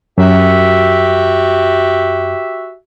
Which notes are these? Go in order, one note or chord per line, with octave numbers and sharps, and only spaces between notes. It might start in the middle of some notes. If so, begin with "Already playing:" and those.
F#2 F#4 G4 E5